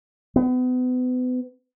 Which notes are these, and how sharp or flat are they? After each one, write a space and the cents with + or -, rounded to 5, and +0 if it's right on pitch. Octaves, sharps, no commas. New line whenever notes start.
B3 +35